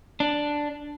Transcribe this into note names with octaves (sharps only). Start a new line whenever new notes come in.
D4